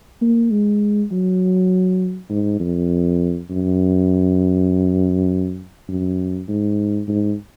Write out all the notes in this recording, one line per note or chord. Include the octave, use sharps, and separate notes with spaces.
A#3
G#3
F#3
G#2
F2
F#2
F#2
G#2
G#2